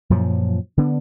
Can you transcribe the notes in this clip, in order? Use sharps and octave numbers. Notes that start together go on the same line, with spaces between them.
F#2 A#2 F3 F#3
D3 B3 D4